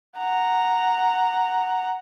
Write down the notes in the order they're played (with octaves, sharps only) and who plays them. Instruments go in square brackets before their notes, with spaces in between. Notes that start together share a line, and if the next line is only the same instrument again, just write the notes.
[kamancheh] F#5 A#5